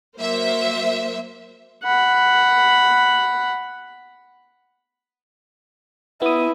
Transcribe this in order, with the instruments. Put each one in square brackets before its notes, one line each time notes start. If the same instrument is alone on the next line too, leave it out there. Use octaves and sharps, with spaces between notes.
[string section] F#3 A#3 C5 E5
[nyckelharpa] F#5 B5
[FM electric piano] B3 D#6 [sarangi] E4